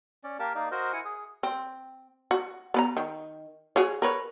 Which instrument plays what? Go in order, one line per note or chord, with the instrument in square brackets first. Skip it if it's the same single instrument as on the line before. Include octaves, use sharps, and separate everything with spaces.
[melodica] C#4 D5
A#3 G4 A#4 A5
A#3 D#4 D5
F#4 A#4 C5 D#5
E4 F#5 G#5
G#4
[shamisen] C4
F#4
B3 B4 A#5
D#3
F#4 G#4 C#5
A#4 B4 C#5